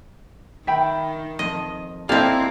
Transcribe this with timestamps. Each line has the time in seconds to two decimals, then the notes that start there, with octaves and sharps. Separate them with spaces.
0.67 D#3 E5 G5 B5
1.39 F2 D#5
2.09 A#3 C4 E4 G4 A4 D5 D#5 F5